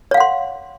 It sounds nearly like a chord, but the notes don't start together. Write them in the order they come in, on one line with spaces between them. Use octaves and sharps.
C#5 F5 F#5 C6